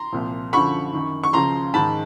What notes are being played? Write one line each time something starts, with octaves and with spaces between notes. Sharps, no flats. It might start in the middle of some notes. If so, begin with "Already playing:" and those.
Already playing: A#5 C6
C2 A#2 F3
F#2 D3 F3 B5 C#6
F#2 D#3
C#6
C#2 C#3 F3 A#5 C6
G#2 D#3 A5 B5